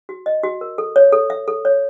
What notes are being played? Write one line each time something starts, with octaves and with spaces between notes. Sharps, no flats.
F#4
D#5
F#4
A#4
A4
C#5
A4
E5
A4
C#5